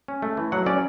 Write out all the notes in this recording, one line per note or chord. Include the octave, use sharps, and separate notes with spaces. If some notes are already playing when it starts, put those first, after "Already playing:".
C#4
A3
E3
F#3 F#5
C#4 D5